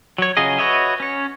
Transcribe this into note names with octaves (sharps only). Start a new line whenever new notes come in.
F#3 C#5
C#3 F#3 F4 G#4 D#5
F#4 B4 C#5 D#5 E5
C#4 C#5